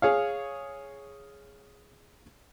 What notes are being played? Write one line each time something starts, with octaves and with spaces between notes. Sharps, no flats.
G#4 C#5 F5